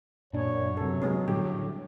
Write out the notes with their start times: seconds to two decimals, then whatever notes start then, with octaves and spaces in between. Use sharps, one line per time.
0.33 F#2 A#2 D4 C#5
0.77 G2 C3 F#3 A4
1.02 G#3 B3 C#4
1.28 A2 D3 G3 G4